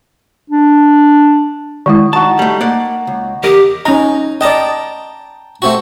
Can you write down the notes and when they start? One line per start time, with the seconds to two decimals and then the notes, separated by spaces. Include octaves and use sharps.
0.50 D4
1.86 D#3 G#3 E4
2.13 D#4 F#4 A5
2.39 G3 A3
2.61 A#3 D5 F#5
3.07 C#2
3.43 E2 G4 A#4 D#5
3.85 C#4 D#4 A#5
4.41 D5 D#5 G5 A5 A#5
5.62 A3 C4 F#4